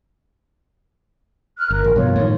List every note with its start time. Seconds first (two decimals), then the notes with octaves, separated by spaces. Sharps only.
1.57 F6 F#6
1.70 G1 A#4
1.84 A1
1.96 G2 B2 F3 F4 C#5
2.16 A2 D#3